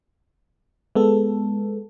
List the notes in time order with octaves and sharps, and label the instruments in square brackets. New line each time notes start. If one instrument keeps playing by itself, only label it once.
[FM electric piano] G#3 B3 A4